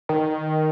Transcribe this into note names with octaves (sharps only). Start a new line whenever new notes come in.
D#3